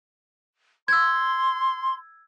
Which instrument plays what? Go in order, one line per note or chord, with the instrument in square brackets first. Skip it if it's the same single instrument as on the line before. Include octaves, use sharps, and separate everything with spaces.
[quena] C6 [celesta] E6 G#6